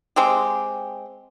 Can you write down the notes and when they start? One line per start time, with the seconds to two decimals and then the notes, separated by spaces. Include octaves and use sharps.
0.16 G#3 C4 G4